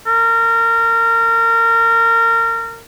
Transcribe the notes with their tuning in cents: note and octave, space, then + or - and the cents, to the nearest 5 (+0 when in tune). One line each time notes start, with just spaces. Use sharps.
A#4 -25